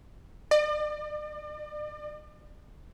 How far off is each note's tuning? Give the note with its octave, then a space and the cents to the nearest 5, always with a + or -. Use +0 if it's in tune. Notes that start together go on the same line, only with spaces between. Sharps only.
D5 +40